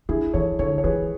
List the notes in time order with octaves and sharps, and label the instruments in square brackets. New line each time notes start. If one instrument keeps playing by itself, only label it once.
[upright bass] D4 [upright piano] E4 G#4
[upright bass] E3 [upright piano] A4 C#5
[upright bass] D3 [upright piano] A4 C#5
[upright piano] C#5
[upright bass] E3 [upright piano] G#4 B4